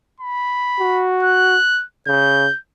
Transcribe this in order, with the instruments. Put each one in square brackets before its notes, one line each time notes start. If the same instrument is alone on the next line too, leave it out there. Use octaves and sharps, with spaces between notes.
[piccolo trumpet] B5
[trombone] F#4
[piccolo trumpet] F#6
[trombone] C#3 [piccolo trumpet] G6